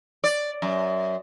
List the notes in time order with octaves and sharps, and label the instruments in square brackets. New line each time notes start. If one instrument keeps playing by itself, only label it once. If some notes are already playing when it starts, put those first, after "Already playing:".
[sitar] D5
F#2